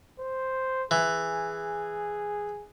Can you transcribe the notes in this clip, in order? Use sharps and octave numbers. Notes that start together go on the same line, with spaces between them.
C5
E3 G#4